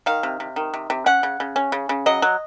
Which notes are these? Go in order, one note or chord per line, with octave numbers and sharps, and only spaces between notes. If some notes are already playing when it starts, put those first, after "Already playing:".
D#3 F5
C3
C3
D#3
C3
C3
C#4 F#5
C#3
C#3
C#4
C#3
C#3
F#3 D#5
F#3